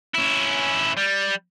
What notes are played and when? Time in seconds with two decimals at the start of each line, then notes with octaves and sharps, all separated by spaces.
0.15 C#4 E4
0.97 G3